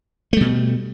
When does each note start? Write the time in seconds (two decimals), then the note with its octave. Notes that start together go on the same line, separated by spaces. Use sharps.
0.33 A3
0.37 G3
0.41 B2